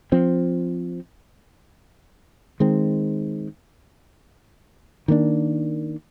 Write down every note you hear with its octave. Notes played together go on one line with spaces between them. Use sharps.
F3 C4
D#3 G#3 C4
D#3 A#3 D4